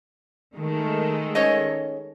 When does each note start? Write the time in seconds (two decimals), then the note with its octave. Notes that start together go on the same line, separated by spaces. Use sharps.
0.56 D#3 G#3 A3
1.35 C#4 C#5 D#5